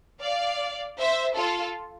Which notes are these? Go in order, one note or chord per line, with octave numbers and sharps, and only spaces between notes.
D5 F5
C5 E5
F4 A4